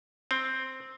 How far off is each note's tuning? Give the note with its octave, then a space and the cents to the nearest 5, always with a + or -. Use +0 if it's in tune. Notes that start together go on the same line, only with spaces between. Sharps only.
C4 +0